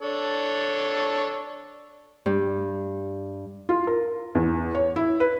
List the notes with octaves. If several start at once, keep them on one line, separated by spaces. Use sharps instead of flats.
D4 A4 C#5
G2
F4
A#4
E2
C#5
E4
B4